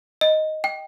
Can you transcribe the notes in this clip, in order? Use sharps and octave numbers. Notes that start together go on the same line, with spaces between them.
D#5
G5